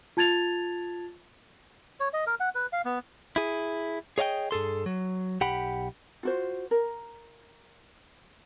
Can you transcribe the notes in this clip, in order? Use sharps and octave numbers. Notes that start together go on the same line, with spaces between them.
F4 A5 G#6 A6 F7
C#5
D#5
A#4
F#5
B4
F5
B3
E4 G#4
G#4 C#5 D#5 F5 G5
G2 G#4 A4 C6
F#3
B1 G4 F#5 G5 B5
F4 F#4 C5
A#4